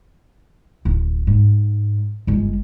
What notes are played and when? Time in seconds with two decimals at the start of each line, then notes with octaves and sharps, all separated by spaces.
0.85 D1
1.27 G#2
2.27 G1 G#3